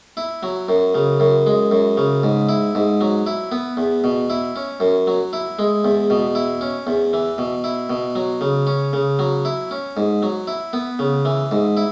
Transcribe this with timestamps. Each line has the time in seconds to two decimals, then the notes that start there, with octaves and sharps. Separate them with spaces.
0.17 E4
0.43 F#3
0.69 F#2
0.95 C#3
1.20 F#2
1.47 G#3
1.71 F#2
1.97 C#3
2.23 G#2
2.49 E4
2.75 G#2
3.01 F#3
3.27 E4
3.52 B3
3.77 E2
4.04 B2
4.30 E4
4.56 C#4
4.80 F#2
5.07 F#3
5.33 E4
5.59 G#3
5.84 E2
6.10 B2
6.35 E4
6.61 C#4
6.87 E2
7.13 E3
7.38 B2
7.64 E4
7.89 B2
8.15 F#3
8.41 C#3
8.67 C#4
8.93 C#3
9.19 F#3
9.45 E4
9.71 C#4
9.97 G#2
10.22 F#3
10.47 E4
10.73 B3
10.99 C#3
11.25 E3
11.51 G#2
11.77 E4